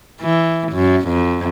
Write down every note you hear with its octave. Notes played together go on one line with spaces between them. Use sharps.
E3
F#2
F2